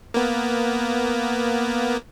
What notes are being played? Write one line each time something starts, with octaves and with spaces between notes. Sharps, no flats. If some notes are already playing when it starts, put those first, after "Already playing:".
A#3 B3